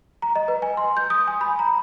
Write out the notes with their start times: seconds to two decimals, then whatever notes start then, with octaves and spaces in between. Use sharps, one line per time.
0.22 A#5
0.36 D#5
0.48 B4
0.62 G#5
0.77 C6
0.97 G6
1.10 D#6
1.28 G#5
1.41 B5
1.59 A#5